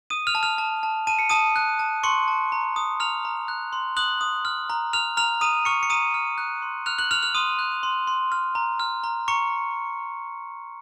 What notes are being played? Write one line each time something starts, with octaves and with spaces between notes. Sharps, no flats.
D#6 D#7
F6 F7
A5
F6 F7
A5
A5
A5 D#7
C#7
A5 D#6 D#7
F#6
A5
C6 C#6 C#7
A5
A#5
D#6
A#5 F6 F7
A#5
F#6
C6
D#6 F#6 F#7
D#6
F6
A#5
F6 F7
A#5 F6 F7
A#5 D#6 D#7
C#6 F6 C#7
C#7
A#5 D#6 D#7
F6
F#6
C6
F6 F#6 F7
F#6 F#7
F6 F#6 F7
F6 F7
C6 D#6 D#7
F#6
C6
C6
F6
A#5
F6
A#5
A#5 C#6 C#7